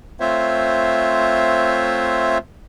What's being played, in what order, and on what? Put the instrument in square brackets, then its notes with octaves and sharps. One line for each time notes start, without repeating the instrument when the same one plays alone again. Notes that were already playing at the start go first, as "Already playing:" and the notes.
[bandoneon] A3 C4 F4 C5 C#5 E5